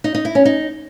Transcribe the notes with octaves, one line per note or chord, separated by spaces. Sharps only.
D#4
D#4
E4
C#4
D#4